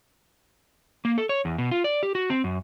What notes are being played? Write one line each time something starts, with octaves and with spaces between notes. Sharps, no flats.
A#3
A4
C#5
E2
B2
F4
D5
G4
F#4
C4
F#2